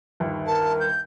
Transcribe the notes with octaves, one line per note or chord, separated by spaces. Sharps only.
G1 D#2
A#4 A5
G6